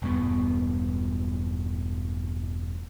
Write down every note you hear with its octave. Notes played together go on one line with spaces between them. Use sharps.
E1 G2 B3